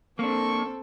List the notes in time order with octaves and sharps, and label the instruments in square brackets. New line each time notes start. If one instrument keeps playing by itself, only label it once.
[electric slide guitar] A#3 D4 [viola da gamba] C4 A4 [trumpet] C#6